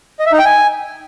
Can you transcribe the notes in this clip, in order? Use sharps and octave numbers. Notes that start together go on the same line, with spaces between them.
D#5
E5
D#4
G5
G#5